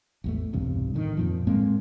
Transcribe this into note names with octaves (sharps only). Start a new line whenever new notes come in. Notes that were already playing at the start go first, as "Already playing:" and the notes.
A1 E2 A3
B1 E2 G2 C3
A2 D3 D#3
F2 A#2 F3
A2 G#3 A#3 C4